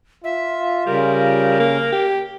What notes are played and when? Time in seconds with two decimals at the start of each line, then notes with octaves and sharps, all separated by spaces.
0.24 F4 E5
0.87 C#3 G3 A#4
1.60 A#3
1.92 G4